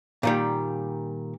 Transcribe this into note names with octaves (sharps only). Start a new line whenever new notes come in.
A#2 D#3 G3